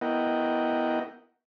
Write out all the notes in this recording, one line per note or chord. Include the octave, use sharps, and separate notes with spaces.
B3 E4 A#4 D#5 F#5 G5